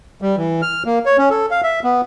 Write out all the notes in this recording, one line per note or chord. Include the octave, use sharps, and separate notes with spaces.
G3
E3
F6
A#3
C#5
C#4
A4
F5
E5
B3